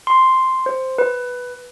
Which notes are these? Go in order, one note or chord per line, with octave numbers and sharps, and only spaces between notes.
C6
C5
B4